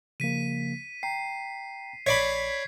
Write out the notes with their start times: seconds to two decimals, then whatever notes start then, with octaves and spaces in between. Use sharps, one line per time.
0.20 C#3 F3 A#3 B6 D#7
1.03 G5 A#5 C7
2.07 A#1 C#5 D5 B5 G#6 B6 C7